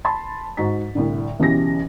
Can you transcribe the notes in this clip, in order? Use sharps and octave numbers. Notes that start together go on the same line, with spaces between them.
A5 B5 C6 A6
G#2 D#4 F#4 A#5 B6
C2 A2 D3
B1 C#3 E3 C#4 G4 A#6